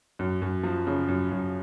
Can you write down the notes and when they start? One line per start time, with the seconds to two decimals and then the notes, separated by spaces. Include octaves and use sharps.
0.19 F#2
0.42 F#2
0.63 F3
0.87 C#3
1.08 F#2
1.32 F#2